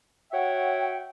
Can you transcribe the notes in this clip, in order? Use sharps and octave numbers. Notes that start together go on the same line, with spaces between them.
F#4 C#5 E5 F#5 G5